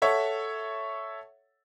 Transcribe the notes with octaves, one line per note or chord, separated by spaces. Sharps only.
A4 C#5 E5 F#5